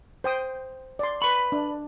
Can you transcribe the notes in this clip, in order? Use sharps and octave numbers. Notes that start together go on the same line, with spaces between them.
C5 G5 D#6
D5 C6
B4 B5 C#6
D4